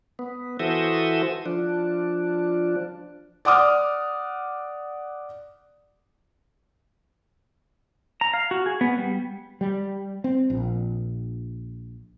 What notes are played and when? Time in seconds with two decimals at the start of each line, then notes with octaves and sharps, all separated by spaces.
0.19 B3
0.60 E3 F#4 A4 C5 E5 D#6
1.46 F3 D4
3.45 D5 F#5 D6 D#6 F6
8.21 A#5
8.34 F5
8.51 F#4
8.66 G#4
8.81 B3
8.98 G3
9.61 G3
10.24 C4
10.50 A#1